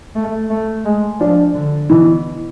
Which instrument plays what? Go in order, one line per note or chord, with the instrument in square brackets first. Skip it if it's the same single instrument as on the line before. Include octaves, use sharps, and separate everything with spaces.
[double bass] A3
A3
G#3
[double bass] F3 [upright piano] D4
[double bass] D3
[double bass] B2 [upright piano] E3